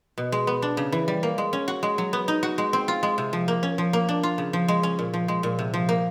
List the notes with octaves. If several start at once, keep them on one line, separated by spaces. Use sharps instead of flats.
B2
G#3
B3
D4
C#3
E3
G3
A#3
G#3
C#4
F#4
G#3
F#3
B3
D#4
F#4
G#3
C4
F4
G#3
C3
F3
A#3
C#4
F3
A#3
D4
F4
C#3
F3
G#3
C#4
A#2
F3
G#3
A#2
C3
F3
A#3